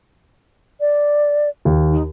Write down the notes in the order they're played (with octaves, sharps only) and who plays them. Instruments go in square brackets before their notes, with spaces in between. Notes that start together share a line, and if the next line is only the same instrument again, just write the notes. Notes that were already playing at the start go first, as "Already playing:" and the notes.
[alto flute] D5
[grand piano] D#2
[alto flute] D#4